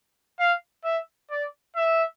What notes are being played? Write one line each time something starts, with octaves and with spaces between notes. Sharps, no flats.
F5
E5
D5
E5